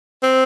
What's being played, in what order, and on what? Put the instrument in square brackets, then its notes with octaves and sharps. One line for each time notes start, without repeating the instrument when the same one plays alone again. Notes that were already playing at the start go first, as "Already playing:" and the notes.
[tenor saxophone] C4